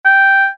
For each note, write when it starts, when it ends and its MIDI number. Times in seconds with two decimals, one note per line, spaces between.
0.05 0.47 79